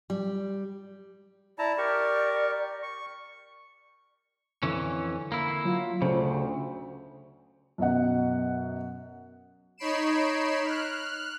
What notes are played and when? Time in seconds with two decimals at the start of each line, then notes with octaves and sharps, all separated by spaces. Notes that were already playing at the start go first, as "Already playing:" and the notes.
0.10 G3
1.59 E4 D5 A5 A#5
1.78 G4 A#4 C#6
2.83 C#6
4.63 F2 D3 E3 C#4
5.32 A#3 E4
5.65 F#3 F4
6.02 D2 C#3 C5
7.78 F#2 B2 D#5 F#5
9.78 D#4 C#5 B5 C7 D7 E7
10.64 F6 F#6